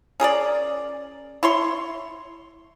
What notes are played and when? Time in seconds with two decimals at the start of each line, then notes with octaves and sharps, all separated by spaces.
0.20 C#4 G#4 A#4 D5
1.43 E4 C#5 C6